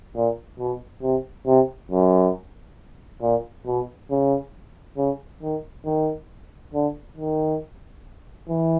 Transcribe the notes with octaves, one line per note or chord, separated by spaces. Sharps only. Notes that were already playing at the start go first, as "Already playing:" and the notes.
A#2
B2
C3
C3
F#2
A#2
B2
C#3
C#3
D#3
D#3
D3
D#3
E3